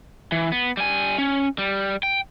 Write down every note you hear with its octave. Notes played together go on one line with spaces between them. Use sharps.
E3
B3
G3 G#5
C#4
G3
G5